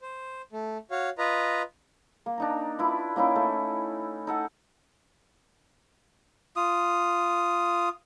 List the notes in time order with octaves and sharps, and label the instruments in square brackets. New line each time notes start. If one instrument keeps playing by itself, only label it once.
[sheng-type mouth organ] C5
A3
F#4 C#5 F5
F4 B4 D#5 A#5
[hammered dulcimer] A#3
D4 D#4 A#5
E4 F4 B4
A#3 C#4 D#4 E4
A3
D#4 A4 F#5
[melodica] F4 D#6